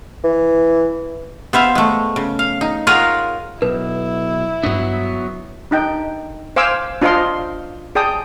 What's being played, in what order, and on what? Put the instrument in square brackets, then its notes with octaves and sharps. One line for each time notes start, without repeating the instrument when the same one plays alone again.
[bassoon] E3
[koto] B3 C5 E5 F5
G#3 A3
C#3
F5
D#4
F4 G#4 A#4 C#5 F5 F#5
[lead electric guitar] B1 [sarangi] E4 [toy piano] B4
[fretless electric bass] G2 D4 [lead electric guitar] F#3 B3
[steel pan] D4 D#4 G5
C5 F5 G#5 D6 E6
D4 F4 C5 D#5 F5 C6
G#4 D5 G5 A5 D#6